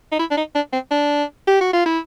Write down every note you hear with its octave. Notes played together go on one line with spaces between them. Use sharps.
D#4
E4
D4
D#4
D4
C4
D4
G4
F#4
F4
E4